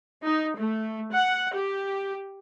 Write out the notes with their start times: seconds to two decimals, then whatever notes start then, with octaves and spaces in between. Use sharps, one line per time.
0.24 D#4
0.57 A3
1.11 F#5
1.55 G4